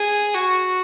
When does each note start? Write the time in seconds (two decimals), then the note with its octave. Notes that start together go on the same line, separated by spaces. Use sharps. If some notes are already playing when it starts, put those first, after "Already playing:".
Already playing: G#4
0.34 F#4